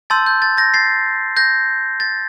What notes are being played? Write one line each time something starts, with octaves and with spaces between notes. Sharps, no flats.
A5 C6 E6 G6 A6
G6
A6
G6 A#6
A6 C7
G6 A#6
A6